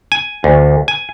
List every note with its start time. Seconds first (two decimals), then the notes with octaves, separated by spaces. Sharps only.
0.12 G#5
0.44 D2
0.88 G#5